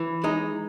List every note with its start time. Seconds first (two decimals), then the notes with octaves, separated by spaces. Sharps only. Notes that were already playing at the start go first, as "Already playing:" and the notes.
Already playing: E3
0.24 G#3 D#4